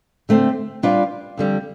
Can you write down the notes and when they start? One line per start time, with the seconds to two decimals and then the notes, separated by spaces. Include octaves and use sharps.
0.29 D3 A3 C4
0.83 G3 D4 F4 B4 D5
1.37 F2 D3 G3